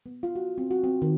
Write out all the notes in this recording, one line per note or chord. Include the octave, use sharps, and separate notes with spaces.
B3
F4
F#4
C4
F#4
C4
D#3